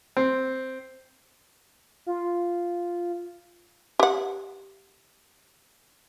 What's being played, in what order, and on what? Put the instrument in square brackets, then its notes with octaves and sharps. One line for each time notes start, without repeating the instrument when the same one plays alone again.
[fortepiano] C4
[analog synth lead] F4
[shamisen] G4 F#5